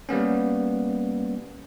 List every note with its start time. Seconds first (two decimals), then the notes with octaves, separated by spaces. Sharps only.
0.09 G3 A#3 B3 C#4